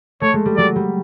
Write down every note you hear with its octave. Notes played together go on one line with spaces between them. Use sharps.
A3 C#5
G#3
G3
F#3 D5
G3